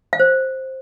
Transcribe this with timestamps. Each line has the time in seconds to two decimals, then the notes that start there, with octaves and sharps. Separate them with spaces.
0.13 F5
0.20 C5